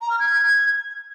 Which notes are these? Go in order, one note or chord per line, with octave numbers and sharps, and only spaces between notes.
A#5
F6
G#6